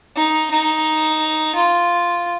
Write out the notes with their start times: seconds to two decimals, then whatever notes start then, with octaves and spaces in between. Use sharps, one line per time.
0.16 D#4
0.50 D#4
1.55 F4